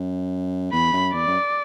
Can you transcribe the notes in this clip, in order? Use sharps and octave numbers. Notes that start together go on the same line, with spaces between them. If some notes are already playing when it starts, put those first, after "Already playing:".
Already playing: F#2
E2 B5
F#2
E2 D5
F#2